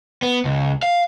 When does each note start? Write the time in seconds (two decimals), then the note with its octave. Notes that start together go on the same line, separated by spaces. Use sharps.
0.22 B3
0.45 C#2
0.83 F5